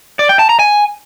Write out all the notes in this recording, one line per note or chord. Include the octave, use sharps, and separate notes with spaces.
D5
G5
A5
A#5
G#5